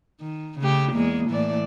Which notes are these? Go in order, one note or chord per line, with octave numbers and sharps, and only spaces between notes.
D#3
C#3 A3 G4
E2 G#3 A#3
A2 E3 D5